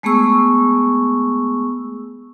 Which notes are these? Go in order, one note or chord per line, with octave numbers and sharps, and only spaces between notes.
G#3 A3 B3 G#4 C#6 E6